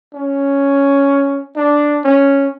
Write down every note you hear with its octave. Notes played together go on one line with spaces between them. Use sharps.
C#4
D4
C#4